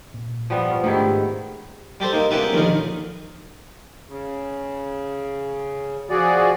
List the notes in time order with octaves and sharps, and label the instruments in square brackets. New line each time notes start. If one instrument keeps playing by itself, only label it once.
[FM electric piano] A#2
[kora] F3 G3 B3
[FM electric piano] C5 C#6 F6
[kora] G#2 D#3 E4 [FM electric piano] A3 D4 G4
[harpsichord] G3 G4 A4 C5
A#3 D#4
C#2 A#3 B3 G4 B4 E5
A#1 D#2 D3 D#4 A#4
[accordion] C#3
F3 F#4 G#4 D5